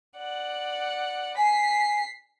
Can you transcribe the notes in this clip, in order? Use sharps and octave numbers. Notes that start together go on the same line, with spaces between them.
D5 F#5
G#5 B6 C7